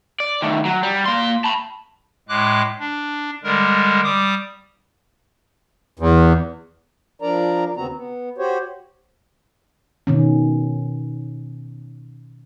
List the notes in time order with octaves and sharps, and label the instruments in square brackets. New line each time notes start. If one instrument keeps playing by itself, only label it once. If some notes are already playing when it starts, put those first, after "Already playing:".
[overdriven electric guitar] D5
D#3 A3
F#3
G3
A#3 C6
A5 B5
[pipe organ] A2 G#3 D6 F#6
D4
D3 G3 G#3 A#4
G3 D6 D#6
[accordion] E2
[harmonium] F3 D4 A#4 D5 A#5
D#2 C#3 B3 C4 F#4 A#5
B3
F#4 G4 C5 C#5
[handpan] B2 D#3 C#4